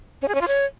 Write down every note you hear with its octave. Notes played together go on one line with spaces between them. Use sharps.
C#4
G#4
C#4
F4
C#5